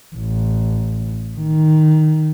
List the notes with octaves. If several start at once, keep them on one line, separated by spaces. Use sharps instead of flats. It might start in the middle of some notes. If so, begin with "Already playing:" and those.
A1
D#3